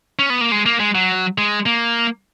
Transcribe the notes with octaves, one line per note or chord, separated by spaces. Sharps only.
C#4
B3
A#3
G#3
A#3
G#3
F#3
G#3
A#3